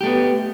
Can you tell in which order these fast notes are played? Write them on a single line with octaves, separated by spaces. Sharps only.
G4 A3 B3